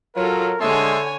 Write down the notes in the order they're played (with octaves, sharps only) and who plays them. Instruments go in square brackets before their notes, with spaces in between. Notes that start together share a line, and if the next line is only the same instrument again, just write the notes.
[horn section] F#3 [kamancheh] F4 A4 [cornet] A#4
[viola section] D3 [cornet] G#3 [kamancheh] C#5 G#5 [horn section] E5 A5 C6